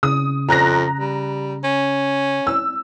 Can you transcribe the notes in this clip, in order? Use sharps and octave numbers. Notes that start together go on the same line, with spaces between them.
C#3 D#6
F2 A#5 F#6 A#6
G3
C#4
E6